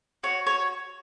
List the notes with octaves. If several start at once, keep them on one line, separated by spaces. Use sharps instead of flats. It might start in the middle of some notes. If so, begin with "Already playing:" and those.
F#4 C#5
C#5